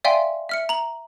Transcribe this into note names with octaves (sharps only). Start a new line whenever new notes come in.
D5 E5 F5 G5 G#5 C6
E5 F6 C#7
A#5 F#7